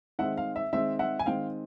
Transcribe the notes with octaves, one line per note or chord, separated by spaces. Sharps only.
D#3 G#3 C4 E5 F#5
F5
E5
D#3 G#3 C4 E5
E5 F#5
G#5
D#3 G#3 C4 F5 G5